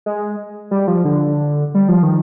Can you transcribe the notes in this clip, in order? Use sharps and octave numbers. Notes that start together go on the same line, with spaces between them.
G#3
G3
F3
D3
G3
F3
D#3